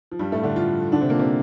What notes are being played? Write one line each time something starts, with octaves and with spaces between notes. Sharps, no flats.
F3
G2 G3
A2 A3
D3 D4
F3 F4
D3 D4
C3 C4
A#2 A#3
C3 C4